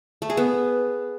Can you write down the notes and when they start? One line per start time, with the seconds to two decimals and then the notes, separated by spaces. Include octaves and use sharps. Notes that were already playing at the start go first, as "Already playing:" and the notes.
0.22 A3
0.30 G#4
0.37 B3